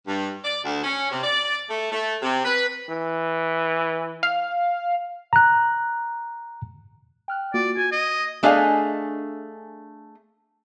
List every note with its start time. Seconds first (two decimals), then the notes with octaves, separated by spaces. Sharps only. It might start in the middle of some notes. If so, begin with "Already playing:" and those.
0.07 G2
0.45 D5
0.64 D2
0.84 C#4
1.11 C3
1.24 D5
1.69 A3
1.92 A3
2.22 C3
2.44 B4
2.89 E3
4.23 F5
5.33 A#5 F#6
7.28 G5 F6 F#6
7.54 A#3 F4 F#4 D5
7.77 F#4 G#5
7.92 D#5
8.43 A3 D4 G#4 D#5 F5 G#5